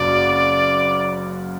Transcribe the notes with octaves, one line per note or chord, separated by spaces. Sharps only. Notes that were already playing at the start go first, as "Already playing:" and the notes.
Already playing: F#1 F#2 C#3 D5